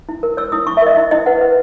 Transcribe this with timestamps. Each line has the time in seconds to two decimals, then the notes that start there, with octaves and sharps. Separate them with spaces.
0.09 E4
0.23 A#4
0.37 C#5 E6
0.52 E4 D#6
0.67 E4 C#6
0.77 E5
0.82 A#4 D#5
0.97 E4 D#5
1.11 E4 D#5
1.26 B4 F#5
1.41 B4